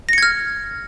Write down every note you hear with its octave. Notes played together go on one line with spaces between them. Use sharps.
F6 G#6 A#6 C#7